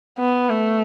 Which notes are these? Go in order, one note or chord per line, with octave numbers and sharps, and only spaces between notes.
B3
A3